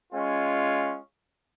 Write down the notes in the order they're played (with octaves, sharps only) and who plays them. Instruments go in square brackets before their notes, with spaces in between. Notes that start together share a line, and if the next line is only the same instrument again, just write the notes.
[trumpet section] G#3 C#4 F4